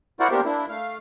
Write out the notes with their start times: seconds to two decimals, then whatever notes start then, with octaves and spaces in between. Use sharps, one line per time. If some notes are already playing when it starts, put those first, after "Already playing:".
0.20 E4 F#4 A#4 C5 D5 F#5
0.31 A#3 B3 D4 G4 A#4 C5
0.45 A#3 D4 E4
0.69 A3 F5